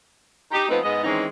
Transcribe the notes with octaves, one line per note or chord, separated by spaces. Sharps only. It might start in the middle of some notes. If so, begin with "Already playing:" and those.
D#4 G4
F3 A3 B3 C4 D#4 B4
G#2 G#3 B3 D#5
D#3 E3 G#3 C4 C#4 D#4